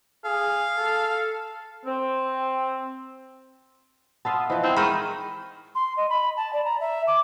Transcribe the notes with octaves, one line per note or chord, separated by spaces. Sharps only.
G#4 F5
A4
C4
B3 E5 F5 A5 C6 D#6
E3 F3 C5 D#5
C4 E4
D#3 G#3 B5 C#6 D#7
C6
D#5
B5
A5
D5
A#5
E5
D6